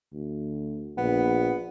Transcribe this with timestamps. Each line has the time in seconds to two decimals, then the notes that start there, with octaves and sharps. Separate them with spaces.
0.13 D2
0.97 A#1 B3